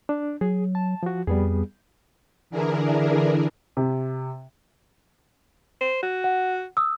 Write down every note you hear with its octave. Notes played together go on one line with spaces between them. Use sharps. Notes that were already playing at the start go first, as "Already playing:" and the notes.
D4
F#3 G#4
A5
F3 F#4
F2 G3 B3 G#4
D3 E3 D4 E4 G#4 A#4
C3
C5
F#4
F#5
D#6 E6